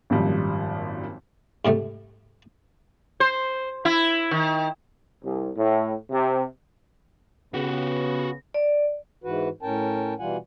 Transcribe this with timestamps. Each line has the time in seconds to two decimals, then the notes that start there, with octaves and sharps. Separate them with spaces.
0.10 G#1 F#2 A#2 D#3 F3 G3
1.65 G#2 C3 G3 A3
3.20 C5
3.85 E4
4.31 D#3
5.24 C2
5.57 A2
6.10 C3
7.54 C#3 B3 F#4 G4
8.54 D5
9.24 G#2 E3 F#4 B4
9.62 A2 C#4 A#4 G5 A5
10.19 B2 E3 G3 F4 F#5 G#5